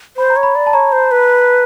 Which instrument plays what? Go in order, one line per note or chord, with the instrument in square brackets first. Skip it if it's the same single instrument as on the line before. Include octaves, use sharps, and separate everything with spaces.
[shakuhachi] C5 [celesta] B5
[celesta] A#5
[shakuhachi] C#5
[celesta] B5
[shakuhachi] D5
[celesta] A5
[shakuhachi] C#5 [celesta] A#5
[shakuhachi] C5
B4